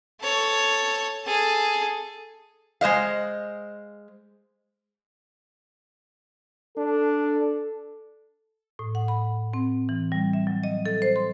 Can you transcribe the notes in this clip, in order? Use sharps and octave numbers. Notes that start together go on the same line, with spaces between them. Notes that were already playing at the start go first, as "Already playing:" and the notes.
A4 C#5
G#4 A4
G#3 C5 D#5 F5
D4 A4
A2
F#5
B5
C4
E3
G3
E5
F#3
D#5
A4
C5
C6